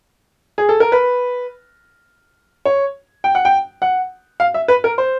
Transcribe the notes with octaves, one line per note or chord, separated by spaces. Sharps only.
G#4
A4
A#4
B4
C#5
G5
F#5
G5
F#5
F5
E5
B4
A#4
C5